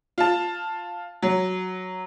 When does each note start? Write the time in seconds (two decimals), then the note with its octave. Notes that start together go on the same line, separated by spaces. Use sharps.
0.18 F4 A5
1.22 F#3